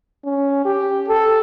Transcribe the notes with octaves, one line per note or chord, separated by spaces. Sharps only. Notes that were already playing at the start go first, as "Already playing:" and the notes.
C#4
G4
A4